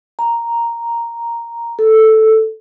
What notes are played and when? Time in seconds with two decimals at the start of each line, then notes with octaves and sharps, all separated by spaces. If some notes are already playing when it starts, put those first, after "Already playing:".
0.19 A#5
1.79 A4